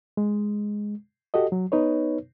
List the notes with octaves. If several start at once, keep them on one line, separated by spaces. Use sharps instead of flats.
G#3
F#4 G4 A4 D#5
F#3
B3 D#4 B4 C#5